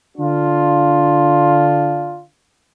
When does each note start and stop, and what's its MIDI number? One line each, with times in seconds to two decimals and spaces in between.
0.17 2.23 50
0.17 2.23 62
0.17 2.23 65